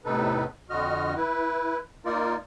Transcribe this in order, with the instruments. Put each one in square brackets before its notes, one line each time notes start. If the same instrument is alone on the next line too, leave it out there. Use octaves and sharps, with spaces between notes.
[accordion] E2 A2 C3 D#4 A4 B4
F2 D3 F#4 D#5 F6
E4 B4
A#3 D#4 F4 A#4 D5